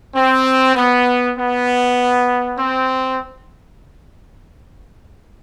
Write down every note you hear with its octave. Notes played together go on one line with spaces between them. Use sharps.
C4
B3
B3
C4